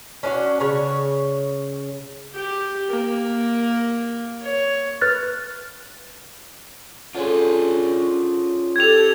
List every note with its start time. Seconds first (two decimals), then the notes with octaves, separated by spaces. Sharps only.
0.23 C#4 D4 E4 F#4
0.60 C#3 C#5
2.34 G4
2.89 A#3
4.42 C#5
5.01 B4 F6 F#6 A6
7.15 D3 C#4 F4 G#4 C5
8.76 G4 A4 G#6 F7